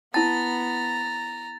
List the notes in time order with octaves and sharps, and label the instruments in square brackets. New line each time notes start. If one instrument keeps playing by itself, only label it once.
[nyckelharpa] B3 [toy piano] E4 A5 [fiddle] A#5 [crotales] A6